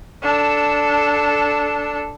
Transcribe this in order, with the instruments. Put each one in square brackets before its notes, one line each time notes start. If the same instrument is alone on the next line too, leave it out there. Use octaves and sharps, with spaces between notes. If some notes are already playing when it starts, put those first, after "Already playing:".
[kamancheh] D4 A4